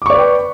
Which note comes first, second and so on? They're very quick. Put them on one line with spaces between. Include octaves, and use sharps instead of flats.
D6 C#6 D5 B4 G5